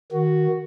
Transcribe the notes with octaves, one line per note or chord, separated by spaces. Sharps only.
D#3 F#4